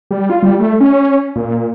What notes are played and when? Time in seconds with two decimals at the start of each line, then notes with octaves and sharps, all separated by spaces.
0.11 G3
0.30 F4
0.43 G3
0.60 A3
0.80 C#4
1.36 A#2